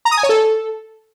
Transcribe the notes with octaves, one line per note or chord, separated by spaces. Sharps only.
A#5
D#6
G#5
C#5
A4